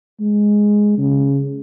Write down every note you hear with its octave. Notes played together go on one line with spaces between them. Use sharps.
G#3
C#3